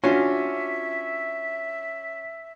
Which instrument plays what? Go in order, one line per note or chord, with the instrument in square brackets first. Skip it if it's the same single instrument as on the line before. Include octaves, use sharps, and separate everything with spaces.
[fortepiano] C#4 [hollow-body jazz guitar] D4 F4 F#4 [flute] E5